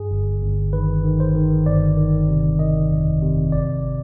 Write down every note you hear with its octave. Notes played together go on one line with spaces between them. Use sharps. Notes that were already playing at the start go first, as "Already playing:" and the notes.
Already playing: G2 G#4
G1
G1
D#3 B4
D#3
C5
D#3
G1 D5
D#3
C3
D#3 D#5
F2
C3
G#1 D5